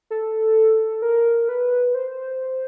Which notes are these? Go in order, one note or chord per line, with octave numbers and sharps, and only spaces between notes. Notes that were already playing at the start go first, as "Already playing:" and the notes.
A4
A#4
B4
C5